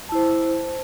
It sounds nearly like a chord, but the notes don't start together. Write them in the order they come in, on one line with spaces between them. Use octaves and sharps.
A5 E4 C5